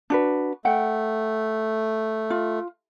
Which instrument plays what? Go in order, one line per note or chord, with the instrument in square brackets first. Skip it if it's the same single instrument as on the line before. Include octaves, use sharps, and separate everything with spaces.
[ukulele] D4 F#4 B4
[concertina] A3 [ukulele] F#5 G5
[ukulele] F4